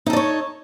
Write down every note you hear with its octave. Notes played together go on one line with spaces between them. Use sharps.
D#4 A4 C#5 D5